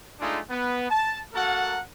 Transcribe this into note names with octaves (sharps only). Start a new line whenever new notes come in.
G#3 A3 D4 D#4 F4 G#4
B3
A5
A#3 F#4 A4 A#4 F#5 A5